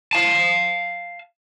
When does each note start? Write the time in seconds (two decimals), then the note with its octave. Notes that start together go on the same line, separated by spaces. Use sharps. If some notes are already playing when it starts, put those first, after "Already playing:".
0.13 F5 A5